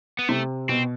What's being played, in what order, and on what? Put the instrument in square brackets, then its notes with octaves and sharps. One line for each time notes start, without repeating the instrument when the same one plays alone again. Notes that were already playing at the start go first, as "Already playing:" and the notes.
[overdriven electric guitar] B3
[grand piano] C3 [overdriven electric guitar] A3
[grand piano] B2 [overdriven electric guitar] C4